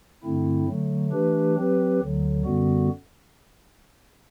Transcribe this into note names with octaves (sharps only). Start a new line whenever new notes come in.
G2 D3 A3 C4 E4
D3 F#3 A3
E3 A3 D4 G4 B4
F#3 C4 G4 B4
D2 D3 F#3
F#2 D3 G3 B3 F#4